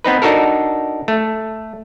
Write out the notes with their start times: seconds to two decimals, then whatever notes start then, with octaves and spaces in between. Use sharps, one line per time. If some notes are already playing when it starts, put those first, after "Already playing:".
0.05 B3 C4 D#4 B4
0.22 D4 D#4 F#4 A4 A#4
1.08 A3